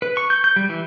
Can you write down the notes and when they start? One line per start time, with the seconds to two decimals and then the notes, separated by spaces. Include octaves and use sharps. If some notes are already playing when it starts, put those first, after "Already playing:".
0.02 B4
0.17 C#6
0.30 G6
0.44 G6
0.56 G3
0.69 E3